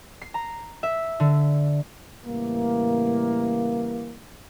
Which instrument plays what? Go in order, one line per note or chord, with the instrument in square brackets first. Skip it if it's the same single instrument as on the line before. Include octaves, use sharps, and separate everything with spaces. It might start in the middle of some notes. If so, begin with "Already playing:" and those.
[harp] C7
A#5
E5
D3
[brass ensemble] A2 C#3 E3 G3 A#3